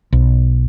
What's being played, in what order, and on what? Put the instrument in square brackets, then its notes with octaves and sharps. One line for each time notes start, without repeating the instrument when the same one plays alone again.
[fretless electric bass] B1